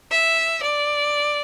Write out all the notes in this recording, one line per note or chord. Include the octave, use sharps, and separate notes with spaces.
E5
D5